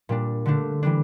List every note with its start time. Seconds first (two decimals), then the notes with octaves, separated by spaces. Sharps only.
0.09 A#2 G3 D4
0.46 D3 A3 D4
0.83 E3 G3 D4